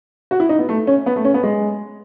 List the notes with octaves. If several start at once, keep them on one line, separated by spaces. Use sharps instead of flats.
F#4
E4
D#4
B3
A3
C#4
B3
A3
C#4
B3
G#3